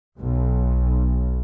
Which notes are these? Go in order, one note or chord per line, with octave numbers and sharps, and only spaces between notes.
B1